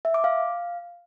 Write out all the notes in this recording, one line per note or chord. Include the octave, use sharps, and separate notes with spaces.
E5
D6
F5